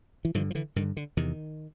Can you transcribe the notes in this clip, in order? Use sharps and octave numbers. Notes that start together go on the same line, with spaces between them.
E3
G2 D3 D#3 F3
F3
D3 E3
G2 D3 D#3
D3
E2 C3 D#3